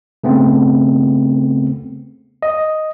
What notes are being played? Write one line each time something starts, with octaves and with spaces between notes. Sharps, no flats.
C#3 A3 B3 C4
D#5